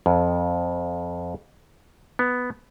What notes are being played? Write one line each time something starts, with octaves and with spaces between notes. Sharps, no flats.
F2
B3